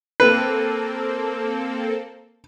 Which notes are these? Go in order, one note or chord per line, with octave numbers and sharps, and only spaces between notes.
A#3 C4 A4 B4